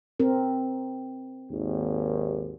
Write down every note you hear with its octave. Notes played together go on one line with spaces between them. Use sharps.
C4 A#4
G#1 D#2